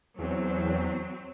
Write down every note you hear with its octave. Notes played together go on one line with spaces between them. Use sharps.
E2 F#3 C4